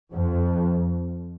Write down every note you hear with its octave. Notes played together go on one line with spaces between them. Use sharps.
F2